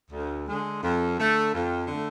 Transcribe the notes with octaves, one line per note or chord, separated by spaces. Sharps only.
D2
D3 G#3
F2
D3 A3
F2
D3 A3